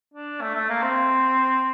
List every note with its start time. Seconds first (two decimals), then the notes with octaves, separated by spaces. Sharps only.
0.14 D4
0.41 A3
0.55 A3
0.69 A#3
0.82 C4